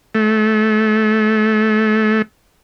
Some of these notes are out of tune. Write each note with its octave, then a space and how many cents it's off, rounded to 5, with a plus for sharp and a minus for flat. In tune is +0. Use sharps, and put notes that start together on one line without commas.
A3 -25